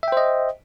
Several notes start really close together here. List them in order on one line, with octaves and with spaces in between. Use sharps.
E5 G5 C5 D#5